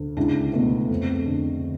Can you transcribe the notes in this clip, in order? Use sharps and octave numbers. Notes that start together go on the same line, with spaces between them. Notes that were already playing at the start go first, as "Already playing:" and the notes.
Already playing: D2
C#2 D4 E4
B2 A3 B3
F2
D3